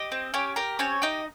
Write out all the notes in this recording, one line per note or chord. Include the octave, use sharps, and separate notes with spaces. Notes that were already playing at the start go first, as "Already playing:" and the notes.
Already playing: G4 D#5
C4
C#4 G4 C#5
G4 A#4
C4 C#4 C#5
D#4 G4 D#5